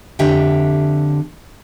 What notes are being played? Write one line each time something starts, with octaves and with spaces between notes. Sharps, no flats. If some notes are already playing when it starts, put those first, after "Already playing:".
F2 D3 G4 E5 G5